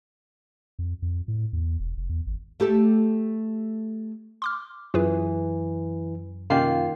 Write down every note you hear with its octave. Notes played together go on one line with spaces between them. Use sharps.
F2
F2
A2
E2
E1
F1
E2
G#1
A3 G4 A4
C6 D6 F6
F#2 E3 F4 G#4 B4
C3 D#3 A#3 C#4 F4 C7